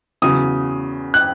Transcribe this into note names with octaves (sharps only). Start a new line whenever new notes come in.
E2 C#3 F#3 D#6
F#6